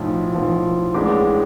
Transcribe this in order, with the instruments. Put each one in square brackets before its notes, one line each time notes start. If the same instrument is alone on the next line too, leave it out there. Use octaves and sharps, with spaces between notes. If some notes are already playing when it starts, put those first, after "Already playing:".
Already playing: [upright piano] B1 A2 F3
B1 A2 F3
A1 A2 G#3 D4 D6